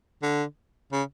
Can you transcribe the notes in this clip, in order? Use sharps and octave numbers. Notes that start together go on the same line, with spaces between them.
D3
C#3